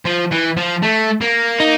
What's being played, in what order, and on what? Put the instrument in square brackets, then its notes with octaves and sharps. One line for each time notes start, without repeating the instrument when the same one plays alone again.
[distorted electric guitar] F3
E3
F3
A3
A#3
[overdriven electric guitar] D#4